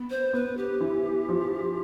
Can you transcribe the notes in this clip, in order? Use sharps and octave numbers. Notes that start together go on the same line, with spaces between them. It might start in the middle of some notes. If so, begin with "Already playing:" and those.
Already playing: B3
C5
B3 B4
G4
E3
F3